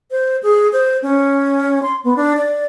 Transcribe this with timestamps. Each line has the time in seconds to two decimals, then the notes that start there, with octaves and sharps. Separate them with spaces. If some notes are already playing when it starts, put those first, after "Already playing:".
0.11 C5
0.43 G#4
0.73 C5
1.03 C#4
1.83 C6
2.04 B3
2.16 D4
2.37 D5